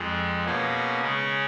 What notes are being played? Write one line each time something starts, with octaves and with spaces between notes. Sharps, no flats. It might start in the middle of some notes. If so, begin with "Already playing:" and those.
Already playing: F2 F3 G#3
B2 A#3 C#4 G#4
C#3 G#3 C#4